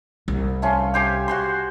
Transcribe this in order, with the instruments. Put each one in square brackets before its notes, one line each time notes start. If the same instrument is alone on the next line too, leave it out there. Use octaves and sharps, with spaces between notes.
[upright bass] C2
[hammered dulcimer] A3 C#4 F4
G4 C5 G#5
F#4 C5 C6